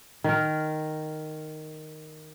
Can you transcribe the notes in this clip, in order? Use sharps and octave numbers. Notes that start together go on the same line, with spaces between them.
D#3 A#4